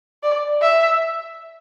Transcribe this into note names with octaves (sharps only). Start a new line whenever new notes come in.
D5
E5